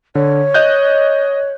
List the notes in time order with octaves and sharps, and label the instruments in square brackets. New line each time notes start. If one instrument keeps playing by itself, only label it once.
[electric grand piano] D3 [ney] C#5
[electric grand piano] D#5 F#6 G6